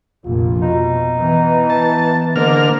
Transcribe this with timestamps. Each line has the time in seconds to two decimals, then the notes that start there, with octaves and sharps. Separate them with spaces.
0.25 F1 A#1 F4
0.62 B2 D#4
1.19 E3 B3
1.70 A5
2.36 G#2 D3 A#3 F6